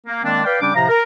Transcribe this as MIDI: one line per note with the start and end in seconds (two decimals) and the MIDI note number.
0.07 0.22 58
0.23 0.42 51
0.23 0.42 56
0.23 0.42 58
0.23 0.42 60
0.23 0.42 62
0.44 0.57 71
0.44 0.57 74
0.44 0.57 77
0.44 0.57 79
0.61 0.73 49
0.61 0.73 55
0.61 0.73 61
0.61 0.73 62
0.61 0.73 79
0.61 0.73 86
0.74 0.88 45
0.74 0.88 48
0.74 0.88 53
0.74 0.88 77
0.74 0.88 82
0.88 1.01 70